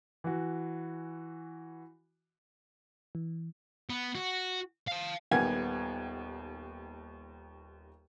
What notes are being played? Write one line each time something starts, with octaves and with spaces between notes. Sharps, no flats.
E3 F#4
E3
B3
F#4
F5 A5
D#1 D#2 B3 F#5 G#5 G#6